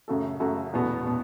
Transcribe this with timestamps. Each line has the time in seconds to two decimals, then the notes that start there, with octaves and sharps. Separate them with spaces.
0.08 F#2 C#3 A3 F#4 A4
0.40 F#2 C#3 A3 F#4 A4
0.72 E1 E2 B2 B3 F#4
1.07 B2